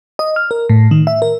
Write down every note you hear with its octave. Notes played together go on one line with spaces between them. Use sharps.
D#5
F6
A#4
A2
D#3
E5
A#4